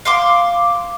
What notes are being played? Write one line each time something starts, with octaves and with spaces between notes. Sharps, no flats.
F5 C6 D6